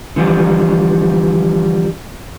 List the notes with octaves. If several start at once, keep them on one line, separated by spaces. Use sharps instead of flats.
D3 E3 F3 G3